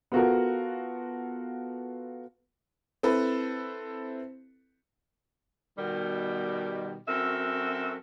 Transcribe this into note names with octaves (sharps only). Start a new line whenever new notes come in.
B3 F4 F#4 A4 A#4
C4 E4 A4 B4
B2 D#3 G3
F#2 C4 F#4 A4 A#4 E5